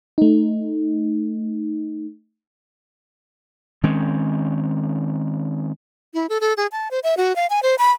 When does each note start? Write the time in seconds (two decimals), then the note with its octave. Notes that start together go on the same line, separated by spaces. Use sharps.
0.18 A3 D#4
3.83 D#3 G#3 C4 C#4
6.14 E4
6.29 A4
6.41 A4
6.57 G#4
6.72 A5
6.91 C5
7.03 E5
7.17 F#4
7.36 F5
7.50 G#5
7.63 C5
7.78 B5